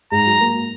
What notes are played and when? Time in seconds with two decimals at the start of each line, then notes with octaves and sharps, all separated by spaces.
0.12 G#2 A#5
0.26 F#3
0.41 A#3